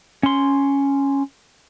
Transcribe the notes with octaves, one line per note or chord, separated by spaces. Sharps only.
C#4 C6